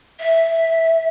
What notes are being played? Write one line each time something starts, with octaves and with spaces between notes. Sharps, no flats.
E5